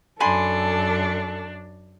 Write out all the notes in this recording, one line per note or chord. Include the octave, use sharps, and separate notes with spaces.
F#2 D4 A4 G#5 B5 C6